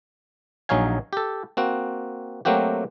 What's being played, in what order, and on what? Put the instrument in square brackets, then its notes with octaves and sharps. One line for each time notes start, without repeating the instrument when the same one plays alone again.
[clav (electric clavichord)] A#1 F#3 D#4 C#5 F5 G#5
G4 A4
A#3 C4 F#4
F#3 A3 A#3 C4 F#4 G4